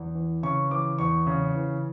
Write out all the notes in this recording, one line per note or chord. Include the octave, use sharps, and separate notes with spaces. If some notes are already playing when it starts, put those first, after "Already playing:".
Already playing: E2
E3
C#3 C#6
E3 D6
E2 C#6
C#3
E3